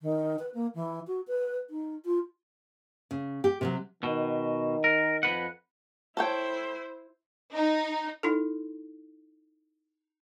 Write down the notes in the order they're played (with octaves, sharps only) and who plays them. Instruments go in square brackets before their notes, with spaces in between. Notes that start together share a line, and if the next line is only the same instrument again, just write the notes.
[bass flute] D#3
B4
A#3
E3
F#4
B4
D#4
F4
[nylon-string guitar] C#3
G4
C3 F3 F#3
[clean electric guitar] B2 [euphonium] D#3
[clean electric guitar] A#4
F2 B4 F#5
[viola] E4 C5 [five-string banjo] A4 C#5 G5
[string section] D#4
[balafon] D#4 E4 A4